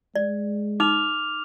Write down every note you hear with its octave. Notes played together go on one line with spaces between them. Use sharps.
G#3 D5
D#4 D6 F6 F7